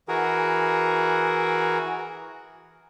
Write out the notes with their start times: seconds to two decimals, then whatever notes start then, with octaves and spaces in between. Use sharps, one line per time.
0.08 E3 F#4 G#4 A#4